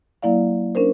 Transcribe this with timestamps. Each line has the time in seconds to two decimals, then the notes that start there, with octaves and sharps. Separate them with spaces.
0.22 F#3 A#3 E4 D5 F5
0.75 C#4 D4 A#4 C5